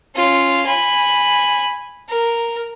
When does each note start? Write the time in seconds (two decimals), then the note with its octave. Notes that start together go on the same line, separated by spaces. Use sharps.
0.15 C#4 F4
0.67 G#5 B5
2.09 A#4